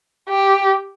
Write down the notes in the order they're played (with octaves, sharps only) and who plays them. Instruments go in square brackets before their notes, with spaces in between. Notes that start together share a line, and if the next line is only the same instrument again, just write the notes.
[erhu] G4